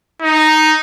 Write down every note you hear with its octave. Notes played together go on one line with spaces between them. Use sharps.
D#4